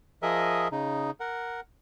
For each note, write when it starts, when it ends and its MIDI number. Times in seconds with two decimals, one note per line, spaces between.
0.22 0.68 53
0.22 0.68 68
0.22 0.68 70
0.22 0.68 75
0.22 0.68 76
0.72 1.11 49
0.72 1.11 63
1.20 1.60 70
1.20 1.60 78